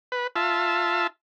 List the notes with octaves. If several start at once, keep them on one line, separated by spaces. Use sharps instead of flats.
B4
F4 E5 A5